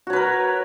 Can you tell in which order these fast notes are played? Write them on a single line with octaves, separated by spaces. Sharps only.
F#4 C#5 B4 A#4